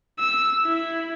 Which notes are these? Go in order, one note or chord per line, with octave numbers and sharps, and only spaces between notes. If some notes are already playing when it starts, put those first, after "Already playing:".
E6
E4